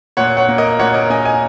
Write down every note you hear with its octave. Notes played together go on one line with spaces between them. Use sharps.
A#2 C#5 F#5
C#5 F#5
A#3
A#4 D#5
A#2 C#5 F#5
A#4 D#5
A#3 D#5 G#5
D#5 G#5